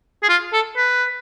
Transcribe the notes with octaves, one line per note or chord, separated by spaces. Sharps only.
G#4
F4
A4
B4